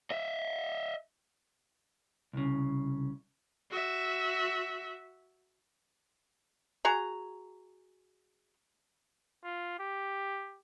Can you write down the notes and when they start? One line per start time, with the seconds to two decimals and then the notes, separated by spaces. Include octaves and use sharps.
0.11 D#5 E5
2.33 C2 C#3
3.71 F#4 E5
6.85 F#4 G#4 A#5
9.44 F4
9.79 G4